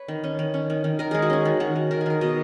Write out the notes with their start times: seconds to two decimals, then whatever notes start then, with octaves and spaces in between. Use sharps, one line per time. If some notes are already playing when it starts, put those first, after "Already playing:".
Already playing: B4 C#5
0.08 D#3
0.24 C#4
0.39 D#3
0.54 C#4
0.70 D#3
0.84 D#3
0.99 D#3 A#4
1.11 G#3 G#4
1.22 F#4
1.30 C#4 G#4
1.45 D#3
1.60 D#3 F#4
1.76 D#3
1.91 D#3 A#4
2.01 G#4
2.06 D#3 A#4
2.21 B2 D#5